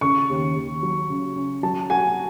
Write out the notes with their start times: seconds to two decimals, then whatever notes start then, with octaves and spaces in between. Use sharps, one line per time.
0.01 C#3 C#6
0.29 D#2
0.55 D#2
0.83 F#3
1.10 C#3
1.36 C#4
1.63 F#3 A5
1.90 F#4 G#5